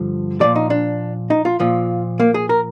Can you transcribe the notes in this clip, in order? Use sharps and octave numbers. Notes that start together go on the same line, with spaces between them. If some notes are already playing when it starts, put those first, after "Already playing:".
Already playing: G2 D3 F3
A#2 F3 D5
D#4
D4
D#4
F4
A#2 F3 F4
A#3
G#4
A#4